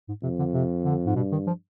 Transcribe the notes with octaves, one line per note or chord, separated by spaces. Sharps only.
G#2
F2 C3
D3
C3
D3
G#2
G2 B2
D#3
F3